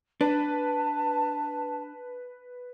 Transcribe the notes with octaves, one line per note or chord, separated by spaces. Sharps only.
D4 B4 A5